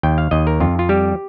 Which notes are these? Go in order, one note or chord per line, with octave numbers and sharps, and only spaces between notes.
D#2 G5
F5
D#2 D#5
A#4
F2 F4
F4
G3 G4